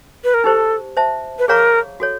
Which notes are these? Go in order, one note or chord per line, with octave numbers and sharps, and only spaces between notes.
B4
A#4
D#4 G4 A4 C5
C5 E5 A5
B4
G#4 A#4 C#5 F5 A#5 C#6
F#4 A4 C#5